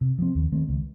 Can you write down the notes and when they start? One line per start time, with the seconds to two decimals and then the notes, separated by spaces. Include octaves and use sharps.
0.01 C3
0.18 F3 C4
0.35 D#2
0.52 D#3 A3 C4
0.68 C#2